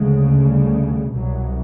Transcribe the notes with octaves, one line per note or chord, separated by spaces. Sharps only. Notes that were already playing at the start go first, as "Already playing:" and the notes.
Already playing: D2 C#3 G#3
G3
C2 B2 F#3